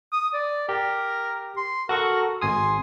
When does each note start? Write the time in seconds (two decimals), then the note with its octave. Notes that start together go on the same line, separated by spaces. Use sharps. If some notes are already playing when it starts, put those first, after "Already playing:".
0.12 D#6
0.34 D5
0.69 G4 A#4
1.57 C6
1.89 F#4 A4 A#4 C#6
2.42 G#1 G#5 C6 D#6